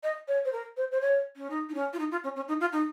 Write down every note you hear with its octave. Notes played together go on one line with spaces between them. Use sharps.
D#5
C#5
C5
A#4
C5
C5
C#5
C#4
D#4
D#4
C#4
F4
D#4
F4
C#4
C#4
D#4
F4
D#4